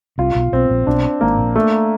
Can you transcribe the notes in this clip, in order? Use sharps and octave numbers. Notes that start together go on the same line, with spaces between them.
C2 C3 F4
B1 B2
B1 B2 C4
A#1 A#2
B1 B2 D4
G#1 G#2 A#3
A#1 A#2
A3